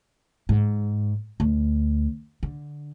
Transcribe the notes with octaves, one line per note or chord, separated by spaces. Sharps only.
G#2
D2
D3